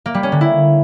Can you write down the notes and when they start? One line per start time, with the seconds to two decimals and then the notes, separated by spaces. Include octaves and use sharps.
0.06 A#3
0.14 G3
0.23 C#4
0.32 D3
0.41 E4